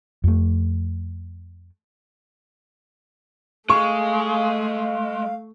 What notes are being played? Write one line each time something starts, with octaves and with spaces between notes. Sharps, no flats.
F2 A3
G#3 A3 F5 C#6